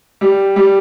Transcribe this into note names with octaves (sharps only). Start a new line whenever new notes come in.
G3
G3